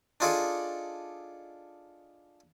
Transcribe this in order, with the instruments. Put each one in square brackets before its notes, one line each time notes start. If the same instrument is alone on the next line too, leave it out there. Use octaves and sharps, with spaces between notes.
[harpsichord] D4 D#4 F4 G#4 A4 D5